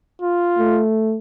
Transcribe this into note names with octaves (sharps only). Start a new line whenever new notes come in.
F4
A3